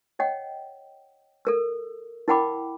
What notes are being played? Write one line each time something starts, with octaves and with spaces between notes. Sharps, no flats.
C#5 D#5 F#5 G5
A4 A#4 E6
E4 A#4 F#5 G5 B5 D6